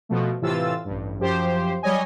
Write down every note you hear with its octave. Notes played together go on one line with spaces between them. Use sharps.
B2 F3 A3
A2 C3 E3 F4 E6 A6
A1 G2
F#2 F3 G4 C5
F#3 G3 C#5 D#5 G#5